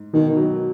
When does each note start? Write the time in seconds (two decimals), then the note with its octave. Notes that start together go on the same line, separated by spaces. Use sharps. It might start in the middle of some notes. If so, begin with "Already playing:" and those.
Already playing: G#2
0.14 B2 D#3
0.37 F#3